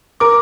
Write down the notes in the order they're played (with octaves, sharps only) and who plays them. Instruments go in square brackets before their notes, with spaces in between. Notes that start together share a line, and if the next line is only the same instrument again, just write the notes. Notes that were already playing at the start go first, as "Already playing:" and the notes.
[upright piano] A#4 [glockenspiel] D6